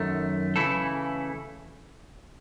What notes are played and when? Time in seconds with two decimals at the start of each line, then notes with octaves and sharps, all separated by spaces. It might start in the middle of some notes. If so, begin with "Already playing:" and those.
Already playing: F#2 D#3 A3
0.56 C#3 E3 A3 E4 A4